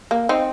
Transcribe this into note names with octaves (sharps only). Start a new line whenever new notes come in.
A#3
C4 D#4